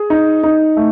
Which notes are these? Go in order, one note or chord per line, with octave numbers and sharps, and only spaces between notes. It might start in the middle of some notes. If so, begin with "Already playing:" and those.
Already playing: G#4
D#4
D#4
A3